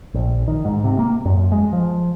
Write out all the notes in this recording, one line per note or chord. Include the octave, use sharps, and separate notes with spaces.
A#1
D#3
G#2
C3
A#3
F#2
F#2
G#3
F3